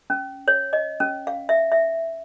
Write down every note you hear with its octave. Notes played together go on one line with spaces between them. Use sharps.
C#4
C#5
D#5
C#4
F5
E5
E5